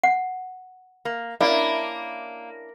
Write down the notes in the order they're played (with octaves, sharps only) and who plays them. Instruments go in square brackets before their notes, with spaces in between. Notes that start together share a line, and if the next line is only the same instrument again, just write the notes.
[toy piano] F#5
[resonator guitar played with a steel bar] A#3
[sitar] A#3 [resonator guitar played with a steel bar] C#4 D4 E4 [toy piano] D5